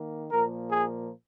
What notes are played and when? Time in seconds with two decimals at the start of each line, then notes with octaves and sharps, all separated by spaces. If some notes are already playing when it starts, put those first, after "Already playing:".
Already playing: D#3 A#3
0.32 A#2 F3 A#3 A#4
0.71 G#4